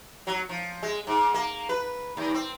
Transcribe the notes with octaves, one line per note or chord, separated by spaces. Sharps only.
F#3
F3
G#3
G#2
A#3
B4
D#2
C4